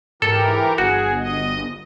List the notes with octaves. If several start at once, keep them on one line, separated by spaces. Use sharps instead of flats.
G#2 E3 G4 A4 A#4
G1 F#4 G#4
D#5